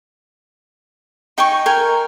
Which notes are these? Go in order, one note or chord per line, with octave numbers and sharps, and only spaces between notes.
D#4 G5 G#5 C#6
A#4 G5 G#5